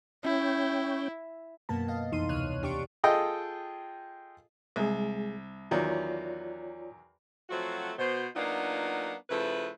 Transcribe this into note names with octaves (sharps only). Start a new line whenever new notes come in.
C#4 E4 G5
F#2 B2 A#3 B3 A5
D#5 F5
C2 F2 E3 D#4 C6 D#7
D2 C3 C#5 F6 F#6 D#7
E2 D4 G4 C#6 D7
F4 G#4 A4 D#5 G5
C2 G#3 G#4
E2 D#3 F#3 F4 C#5 D5
F3 F#3 A3 C4 F#4
B2 C5
F#3 A#3 B3 D4 D#4 F4
C#3 F3 A3 E4 B4